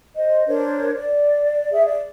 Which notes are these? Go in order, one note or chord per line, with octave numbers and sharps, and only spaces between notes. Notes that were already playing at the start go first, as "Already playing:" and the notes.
C5 D#5
D4 A#4 C5 C#5
D5
G#4 E5
D5